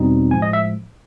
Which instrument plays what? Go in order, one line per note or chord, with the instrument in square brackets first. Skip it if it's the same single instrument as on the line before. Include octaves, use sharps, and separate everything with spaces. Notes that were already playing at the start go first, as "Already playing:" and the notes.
Already playing: [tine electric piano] E2 B2 G3 C4 D#4
A2 F3 G#3 G#5
D#5
E5